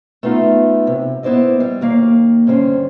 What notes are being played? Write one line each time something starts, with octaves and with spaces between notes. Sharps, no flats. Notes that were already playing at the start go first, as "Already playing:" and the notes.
A3 B3 D#4 F4
C3
B3 E4 C5 D5 D#5
G3
D#2 A#3 F5
G2 D3 C#4 B4 C5